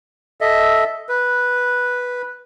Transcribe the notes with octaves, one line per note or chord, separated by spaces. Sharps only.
A4 D#5 E5
B4